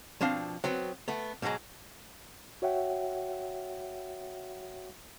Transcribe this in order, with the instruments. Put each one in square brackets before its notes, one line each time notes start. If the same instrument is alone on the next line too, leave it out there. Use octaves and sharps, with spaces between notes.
[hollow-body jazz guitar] B2 F3 C4 D4 F5
F#3 B3 C4
A3 B3
G#2 B2 F3 F#3 G#3
[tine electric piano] F#4 C#5 E5 F#5 G5